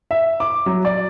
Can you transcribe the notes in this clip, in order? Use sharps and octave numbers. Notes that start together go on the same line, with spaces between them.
E5
D6
F#3
D5